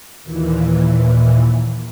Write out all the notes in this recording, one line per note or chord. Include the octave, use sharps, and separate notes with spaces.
D#2 A#2 E3